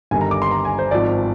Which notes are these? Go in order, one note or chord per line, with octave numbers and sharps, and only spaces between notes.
G1 G2 D#3 G3 G#5
A#5
D6
C6
A#5
G#5
C5
G#1 G#2 F3 D5